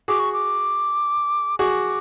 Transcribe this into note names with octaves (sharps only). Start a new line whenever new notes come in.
F#4 G#4 D6
C#6
D6
F#4 G#4 D6